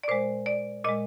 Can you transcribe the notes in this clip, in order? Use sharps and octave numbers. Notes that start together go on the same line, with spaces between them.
D5
A#2 G#3 C5
D5
A#2 G#3 D#5